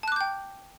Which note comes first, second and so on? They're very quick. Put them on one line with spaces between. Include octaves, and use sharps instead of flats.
A5 F#6 D6 G6 G5